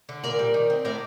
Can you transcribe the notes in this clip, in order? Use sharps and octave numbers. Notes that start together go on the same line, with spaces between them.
D3
A#2 A#4 D5
G3
D#3
C4
A2 A#4 D5